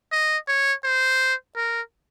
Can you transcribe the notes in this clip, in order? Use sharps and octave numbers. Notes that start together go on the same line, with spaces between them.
D#5
C#5
C5
A#4